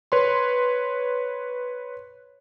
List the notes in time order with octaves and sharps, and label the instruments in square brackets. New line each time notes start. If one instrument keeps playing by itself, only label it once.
[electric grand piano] B4 C#5 C6